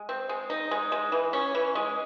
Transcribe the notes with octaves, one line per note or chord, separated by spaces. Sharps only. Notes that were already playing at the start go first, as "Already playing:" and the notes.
Already playing: G#3
C4
G#3
D#4
G#3
G#3
E3
C#4
E3
G#3